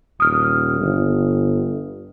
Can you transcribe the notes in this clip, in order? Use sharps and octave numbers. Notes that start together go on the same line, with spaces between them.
D#1 D#6 F6
G1